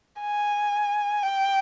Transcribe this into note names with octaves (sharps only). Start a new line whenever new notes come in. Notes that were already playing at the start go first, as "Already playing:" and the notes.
G#5
G5